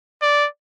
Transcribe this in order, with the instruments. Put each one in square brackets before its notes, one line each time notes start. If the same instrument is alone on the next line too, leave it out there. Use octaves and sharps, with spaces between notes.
[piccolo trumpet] D5